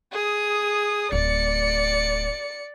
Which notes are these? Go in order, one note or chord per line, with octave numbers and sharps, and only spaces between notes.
G#4 D#6
D1 A3 D5 C#7